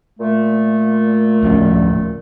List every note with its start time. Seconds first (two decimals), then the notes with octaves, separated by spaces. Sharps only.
0.19 A#2 A3
1.43 D1 F3 C#4